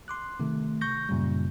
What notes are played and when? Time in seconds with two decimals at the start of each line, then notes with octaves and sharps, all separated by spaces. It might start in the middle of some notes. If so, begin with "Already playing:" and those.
0.08 C6 D6 F#6
0.39 C3 D#3 A3
0.81 C#6 G6 A#6
1.09 F#2 A#2 C#3 G3